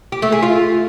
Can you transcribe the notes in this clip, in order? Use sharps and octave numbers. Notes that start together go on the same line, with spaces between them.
G4
A3
G#4
F4